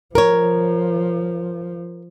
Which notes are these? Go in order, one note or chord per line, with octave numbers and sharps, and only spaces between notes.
F3 A#4 C#5